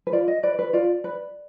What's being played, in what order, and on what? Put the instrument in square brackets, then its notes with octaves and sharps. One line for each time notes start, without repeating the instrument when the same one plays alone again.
[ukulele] B4
F4 D5
D#5
B4 D5
B4
F4 D5
B4